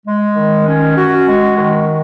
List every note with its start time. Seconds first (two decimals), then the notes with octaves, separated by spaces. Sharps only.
0.06 G#3
0.36 D#3
0.67 C#4
0.98 F#4
1.28 G#3
1.58 D#3